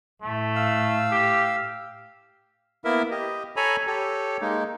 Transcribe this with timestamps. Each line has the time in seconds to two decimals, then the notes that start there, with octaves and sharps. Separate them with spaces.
0.22 A2 A3
0.55 F5 E6
1.11 G4
2.85 A#3 B3 E4 A#4 E5
3.11 G4 D#5
3.56 A4 C#5 G#5 A#5 B5
3.87 G4 A4 C#5
4.41 G#3 A#3 D#4